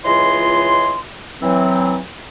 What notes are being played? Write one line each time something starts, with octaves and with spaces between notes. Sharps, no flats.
C#2 E3 F4 C#5 D#5 C6
E3 F#3 C4